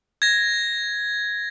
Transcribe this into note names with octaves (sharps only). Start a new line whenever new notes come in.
G#6 A#6